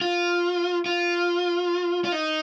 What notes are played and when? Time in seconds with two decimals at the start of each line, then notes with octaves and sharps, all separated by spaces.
0.01 F4
0.86 F4
2.05 F4
2.12 D#4